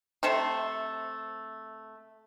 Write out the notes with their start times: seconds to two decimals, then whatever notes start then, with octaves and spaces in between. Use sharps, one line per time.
0.23 C3 A3 A4 C5